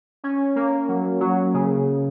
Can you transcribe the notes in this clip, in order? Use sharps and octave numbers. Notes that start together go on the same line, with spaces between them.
C#4
A#3
F#3
F#3
C#3